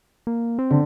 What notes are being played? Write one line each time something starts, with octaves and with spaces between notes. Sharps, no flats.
A#3
C4
D3